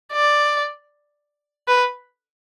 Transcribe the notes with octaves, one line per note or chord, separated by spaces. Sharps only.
D5
B4